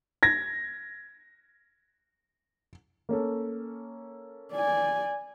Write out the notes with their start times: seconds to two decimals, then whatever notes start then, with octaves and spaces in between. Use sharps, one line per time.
0.23 G#6 A#6
3.09 A#3 C#4 A4
4.53 D5 G#5